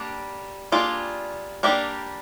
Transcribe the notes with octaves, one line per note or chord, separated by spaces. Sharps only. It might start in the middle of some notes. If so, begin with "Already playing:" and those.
Already playing: G3 A#3 D4
G3 A#3 D4 F4 G#4
G3 A#3 D4 G4 A#4